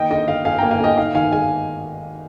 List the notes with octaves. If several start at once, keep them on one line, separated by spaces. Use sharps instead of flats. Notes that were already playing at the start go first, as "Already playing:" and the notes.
Already playing: D#3 A#3 D#5 G5
D3 D#5
D3 F5
D3 F5 G#5
A#3 G5 A#5
F5 G#5
D3 D#5 G5
D#4 F5
D#3 F5 G#5
G#3 F5 G#5